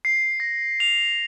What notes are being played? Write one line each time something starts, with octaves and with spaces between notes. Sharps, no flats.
C7
A#6
F7